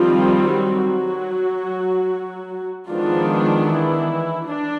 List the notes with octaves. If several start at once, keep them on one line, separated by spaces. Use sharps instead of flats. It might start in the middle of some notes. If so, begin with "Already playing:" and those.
Already playing: D#3 F3 G3 C4 F4
F#3 F#4
D#3 F3 G#3 B3 D4 F4
E3 E4
D4